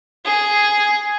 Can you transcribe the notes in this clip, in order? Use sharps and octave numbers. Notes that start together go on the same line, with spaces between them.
G#4